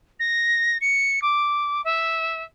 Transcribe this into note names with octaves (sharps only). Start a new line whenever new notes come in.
A#6
C#7
D6
E5